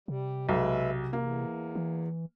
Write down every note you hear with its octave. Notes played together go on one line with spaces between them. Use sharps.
C3 G3
B1 G#3 B4 E5
E2 A#3
E3